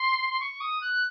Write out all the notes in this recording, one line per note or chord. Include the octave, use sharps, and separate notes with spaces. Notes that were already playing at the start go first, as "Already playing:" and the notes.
Already playing: C6
C6
C#6
D#6
F#6